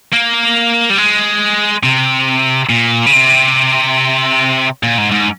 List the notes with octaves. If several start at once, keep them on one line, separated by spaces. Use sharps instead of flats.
A#3
G3
G#3
C3
A#2
C#3
C3
A#2
G#2
G#2